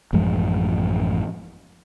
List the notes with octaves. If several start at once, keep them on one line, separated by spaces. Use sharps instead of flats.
A1 F#2 F3 G#3